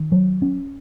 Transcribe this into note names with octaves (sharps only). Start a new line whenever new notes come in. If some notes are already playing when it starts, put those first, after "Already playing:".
Already playing: D#3
F#3
C#4